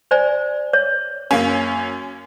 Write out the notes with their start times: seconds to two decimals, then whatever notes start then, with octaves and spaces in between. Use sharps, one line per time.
0.11 C5 D5 G#5
0.73 C#5
1.31 F#2 A#3 C#4